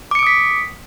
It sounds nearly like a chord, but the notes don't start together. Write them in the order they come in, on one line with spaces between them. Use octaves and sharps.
D6 C#7 D7 D#6 B6